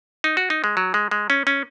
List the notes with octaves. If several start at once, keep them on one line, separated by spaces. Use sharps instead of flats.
D#4
F#4
D#4
G#3
F#3
G#3
G#3
C#4
C#4